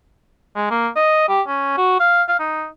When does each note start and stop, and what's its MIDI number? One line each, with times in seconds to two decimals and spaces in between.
0.56 0.67 56
0.71 0.88 58
0.96 1.27 75
1.29 1.42 67
1.48 1.73 61
1.78 1.99 66
2.00 2.23 77
2.28 2.38 77
2.39 2.67 63